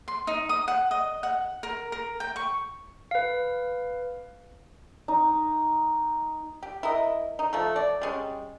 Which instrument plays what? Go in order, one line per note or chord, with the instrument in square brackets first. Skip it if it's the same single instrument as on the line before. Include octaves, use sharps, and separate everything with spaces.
[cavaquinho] C6
D#4
D#6
F#5
D#5
F#5
A#4
A#4
G5
C#6
[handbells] B4 F5
[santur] D#4
[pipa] G4
E4 A#4 D#5
D#4
F3 A3
D5
G3 G#3 C#4